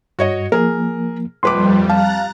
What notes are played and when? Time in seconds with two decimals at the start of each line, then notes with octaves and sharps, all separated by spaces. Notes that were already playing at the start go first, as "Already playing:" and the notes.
0.19 G2 F#4 C#5 D#5
0.52 F3 A#3 G#4 A#4
1.43 D#1 F2 G3 B4 C6 D6
1.90 F5 A5 A#5 F#6 A6